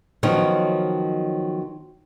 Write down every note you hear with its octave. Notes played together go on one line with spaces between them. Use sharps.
D#3 F3 F#3 B3 C#4 D#4